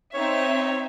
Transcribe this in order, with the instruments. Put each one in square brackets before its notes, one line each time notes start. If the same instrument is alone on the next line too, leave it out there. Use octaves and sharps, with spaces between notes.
[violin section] C4 D#4 E5 [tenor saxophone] C#5